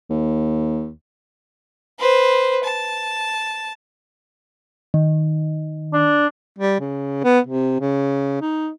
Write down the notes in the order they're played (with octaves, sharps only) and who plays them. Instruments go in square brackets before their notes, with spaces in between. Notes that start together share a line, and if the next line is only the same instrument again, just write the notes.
[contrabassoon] D#2
[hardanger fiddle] B4 C5
A5
[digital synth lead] D#3
[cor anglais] D4
[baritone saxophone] G3
C#3
B3
C3
C#3
D#4